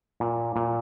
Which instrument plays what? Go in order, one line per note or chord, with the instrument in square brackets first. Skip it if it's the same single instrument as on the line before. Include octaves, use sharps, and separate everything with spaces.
[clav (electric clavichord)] A#2
A#2